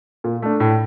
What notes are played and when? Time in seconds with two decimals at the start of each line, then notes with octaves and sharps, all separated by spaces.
0.24 A#2
0.42 A3 D4
0.60 A2